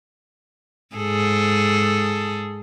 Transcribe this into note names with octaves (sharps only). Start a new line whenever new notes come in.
G#2 G#4 A4